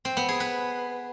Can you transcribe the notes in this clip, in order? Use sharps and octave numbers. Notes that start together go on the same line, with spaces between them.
C4
B3
G#4
B4